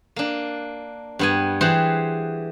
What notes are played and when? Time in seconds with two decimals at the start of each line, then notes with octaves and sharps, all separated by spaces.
0.16 A#3 D4
1.19 G2 B3 G#5
1.61 E3 G4 G#4 C5 F#5 C6